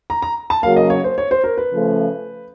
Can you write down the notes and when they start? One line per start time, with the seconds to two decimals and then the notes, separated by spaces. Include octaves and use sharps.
0.10 A#5
0.22 A#5
0.50 A5
0.63 C#3 F#3 A#3 F5
0.76 D#5
0.90 C#5
1.04 C5
1.18 C#5
1.31 C5
1.44 A#4
1.58 B4
1.72 C#3 F3 A3